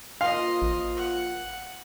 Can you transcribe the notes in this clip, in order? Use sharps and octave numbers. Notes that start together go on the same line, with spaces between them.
F3 A#3 F4 D#5 F5 C6
A1
F#5